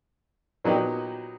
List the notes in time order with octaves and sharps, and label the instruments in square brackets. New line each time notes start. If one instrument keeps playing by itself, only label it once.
[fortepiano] A#2 F#3 B3 D#4 G4